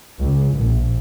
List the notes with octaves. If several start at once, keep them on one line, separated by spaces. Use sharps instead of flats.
C#2
A#1